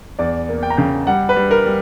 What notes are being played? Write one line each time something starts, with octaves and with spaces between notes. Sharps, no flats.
E2 D5
A#3
G5
A#5
C#3 G5
G3 F#5
B4
G3
A#4
G3